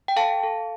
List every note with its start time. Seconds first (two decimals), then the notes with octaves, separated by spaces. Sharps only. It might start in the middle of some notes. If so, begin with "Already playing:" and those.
0.08 G5
0.16 A4 F5 A5
0.43 A4